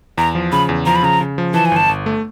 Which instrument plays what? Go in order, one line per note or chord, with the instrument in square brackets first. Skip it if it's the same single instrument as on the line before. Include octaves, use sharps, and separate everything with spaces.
[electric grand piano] E2 [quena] A#5
[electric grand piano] F3
[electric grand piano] C#3 [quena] B5
[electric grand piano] E2
[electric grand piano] F3 [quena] A#5
[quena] B5
[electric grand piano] C#3 [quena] A#5
[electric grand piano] C#3
F3
[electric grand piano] E3 [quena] A5
[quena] G#5
[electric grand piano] G1 [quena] A5
[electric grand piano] G1
A3